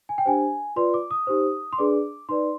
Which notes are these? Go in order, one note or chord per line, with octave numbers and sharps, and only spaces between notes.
G#5
G5
D4 G4 C5 G#5
F4 B4 D5 C6
D6
D#6
D#4 G4 C5
C6
D4 G#4 B4 D5 D6
D#4 B4 D5 C6